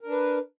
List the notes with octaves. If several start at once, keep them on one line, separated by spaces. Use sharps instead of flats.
D4 A#4 B4